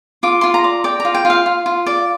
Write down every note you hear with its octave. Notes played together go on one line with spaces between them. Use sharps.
F4 D6
F4 C6
A#5
D5
D5 G5
A#5
F4
G5
F4
F5
F4
F4
D5